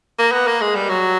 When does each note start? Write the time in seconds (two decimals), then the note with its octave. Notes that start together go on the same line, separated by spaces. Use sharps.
0.19 A#3
0.32 B3
0.47 A#3
0.61 G#3
0.75 G3
0.89 F#3